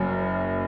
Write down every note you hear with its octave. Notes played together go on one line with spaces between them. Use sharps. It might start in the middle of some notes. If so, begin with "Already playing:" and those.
Already playing: F#1 F#2 F#3 C#4 G#5